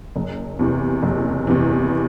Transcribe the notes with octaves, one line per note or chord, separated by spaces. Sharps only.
F#1
E2 C3 E3
F#1
E2 C3 E3